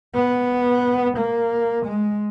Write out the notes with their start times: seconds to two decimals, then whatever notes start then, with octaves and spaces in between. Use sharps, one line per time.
0.15 B3
1.17 A#3
1.85 G#3